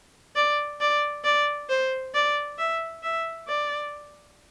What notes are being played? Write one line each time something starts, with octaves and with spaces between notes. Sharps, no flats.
D5
D5
D5
C5
D5
E5
E5
D5